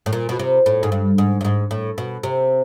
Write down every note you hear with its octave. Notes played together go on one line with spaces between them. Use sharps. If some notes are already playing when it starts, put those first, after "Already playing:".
A2
A#2
B2
C3
A2
G#2
G2
G#2
G2
G#2
A2
B2
C3